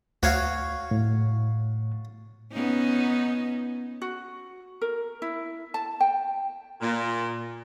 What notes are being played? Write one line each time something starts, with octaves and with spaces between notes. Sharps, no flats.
D2 F#4 C#5 F5
A2
B3 C#4 D#4
F#4
A#4
E4
A5
G5
A#2